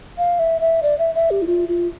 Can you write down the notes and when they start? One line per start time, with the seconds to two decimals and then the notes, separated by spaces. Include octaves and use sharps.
0.18 F5
0.39 E5
0.61 E5
0.83 D5
0.99 E5
1.15 E5
1.31 G4
1.42 E4
1.47 F4
1.69 F4